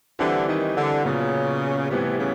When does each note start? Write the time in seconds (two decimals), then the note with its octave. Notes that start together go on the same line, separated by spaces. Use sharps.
0.19 D3 E3 G3 C4 E4 G4
0.48 D#3
0.77 D3
1.05 A#2 C#3 F#3 B3
1.90 A2 C3 E3 G3 B3
2.19 C#3